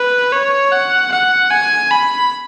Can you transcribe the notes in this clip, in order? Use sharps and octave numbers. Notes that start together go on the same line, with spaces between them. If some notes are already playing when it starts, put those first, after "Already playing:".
Already playing: B4
C#5
F#5
F#5
G#5
B5